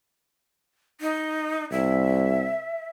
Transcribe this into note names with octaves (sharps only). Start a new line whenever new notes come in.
D#4
C2 E5